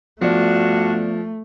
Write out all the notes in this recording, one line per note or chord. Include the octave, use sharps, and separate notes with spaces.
G2 F3 A3 B3 D4 F#4 D5